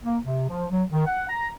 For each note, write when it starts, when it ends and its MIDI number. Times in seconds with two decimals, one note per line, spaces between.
0.04 0.17 58
0.23 0.43 48
0.49 0.65 53
0.71 0.83 54
0.92 1.06 51
1.07 1.25 78
1.29 1.50 82